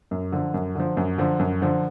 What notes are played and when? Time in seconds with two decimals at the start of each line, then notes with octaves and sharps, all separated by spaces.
0.11 F#2
0.32 D3 F3
0.54 F#2
0.75 D3 F3
0.97 F#2
1.18 D3 F3
1.39 F#2
1.62 D3 F3